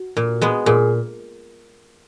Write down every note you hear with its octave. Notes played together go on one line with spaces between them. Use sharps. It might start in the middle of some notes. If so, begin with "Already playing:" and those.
Already playing: F#4
A#2
G#3 B3
A#2 G#4